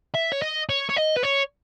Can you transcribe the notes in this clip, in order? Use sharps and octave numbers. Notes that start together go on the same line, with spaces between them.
E5
C#5
D#5
C#5
C#5
D#5
B4
C#5